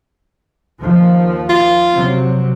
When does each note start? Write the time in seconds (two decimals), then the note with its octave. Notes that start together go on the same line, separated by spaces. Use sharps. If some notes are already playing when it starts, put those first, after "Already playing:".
0.81 D#2 F3
1.50 F4
1.94 C3 F#3 C4